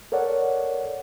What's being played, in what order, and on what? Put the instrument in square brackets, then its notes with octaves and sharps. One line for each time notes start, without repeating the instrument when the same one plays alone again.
[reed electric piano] A4 A#4 C#5 D5 F#5